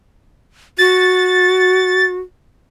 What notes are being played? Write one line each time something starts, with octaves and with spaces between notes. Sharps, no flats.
F#4 A6